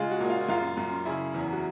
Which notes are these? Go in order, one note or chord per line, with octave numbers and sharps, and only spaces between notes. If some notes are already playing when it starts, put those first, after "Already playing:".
Already playing: C#3 G#3 F4
F#4
A#2
F4
F#2 F4
F#2
C#3 E4
E2
F#4